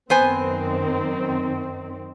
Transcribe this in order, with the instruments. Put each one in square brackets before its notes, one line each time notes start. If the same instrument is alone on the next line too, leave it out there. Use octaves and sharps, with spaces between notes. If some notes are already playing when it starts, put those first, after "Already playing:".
[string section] F#2 D#3 C4 [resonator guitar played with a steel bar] B3 C5 G#5